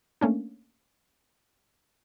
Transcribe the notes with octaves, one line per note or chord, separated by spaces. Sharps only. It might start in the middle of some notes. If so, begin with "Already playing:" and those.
A3 A#3 C#4 D4